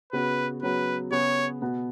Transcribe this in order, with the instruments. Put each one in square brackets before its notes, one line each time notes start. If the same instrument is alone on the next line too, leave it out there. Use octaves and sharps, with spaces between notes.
[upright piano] C#3 B3 F#4 [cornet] B4
[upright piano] C#3 F#3 B3 F#4 [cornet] B4
[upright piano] C#3 B3 G#4 [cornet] C#5
[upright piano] B2 B3 F#4